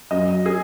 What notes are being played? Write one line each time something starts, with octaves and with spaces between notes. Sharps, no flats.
F#2 D#5
G#4